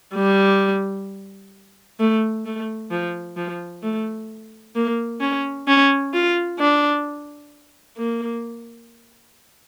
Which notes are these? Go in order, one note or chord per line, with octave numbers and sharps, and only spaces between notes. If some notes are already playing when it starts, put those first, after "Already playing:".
G3
A3
A3
F3
F3
A3
A#3
C#4
C#4
F4
D4
A#3